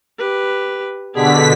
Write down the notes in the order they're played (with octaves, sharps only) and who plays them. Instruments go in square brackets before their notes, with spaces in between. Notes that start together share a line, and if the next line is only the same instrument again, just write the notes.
[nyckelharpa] G4 B4
[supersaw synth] B2 D3 B6 [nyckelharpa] G4 G#4